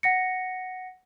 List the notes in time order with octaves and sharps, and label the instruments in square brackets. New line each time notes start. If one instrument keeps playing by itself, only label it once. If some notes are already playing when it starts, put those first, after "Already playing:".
[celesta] F#5 A#6 C#7